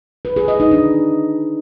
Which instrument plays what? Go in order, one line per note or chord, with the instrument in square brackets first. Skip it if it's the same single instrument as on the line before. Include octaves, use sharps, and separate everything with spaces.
[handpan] B4
G#4
D#5
D#4
D4